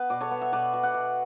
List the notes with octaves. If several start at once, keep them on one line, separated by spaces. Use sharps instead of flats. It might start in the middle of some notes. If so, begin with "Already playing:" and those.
Already playing: B3 B4
B2 D5
A4 C#5
B3
E5
B2 B4 D5
B2
D5 F#5
B2